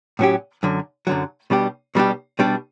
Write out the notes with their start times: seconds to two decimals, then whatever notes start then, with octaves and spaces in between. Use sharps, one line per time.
0.19 A2 F#3 C#4 G4
0.63 F#2 D3 F#3
1.07 F#2 D3 F#3
1.50 B2 G3 D4 G4
1.95 B2 G3 D4 G4
2.39 B2 G3 D4